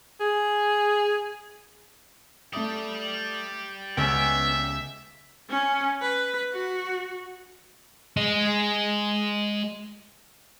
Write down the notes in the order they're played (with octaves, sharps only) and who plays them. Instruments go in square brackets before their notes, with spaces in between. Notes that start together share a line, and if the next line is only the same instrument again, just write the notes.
[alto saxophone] G#4
[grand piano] A3 E5 D#6 [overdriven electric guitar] G4 D5
[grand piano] C#2 G#5 [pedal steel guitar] B3 C#4 G5 [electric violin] E5
[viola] C#4
B4
F#4
[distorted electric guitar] G#3 D#5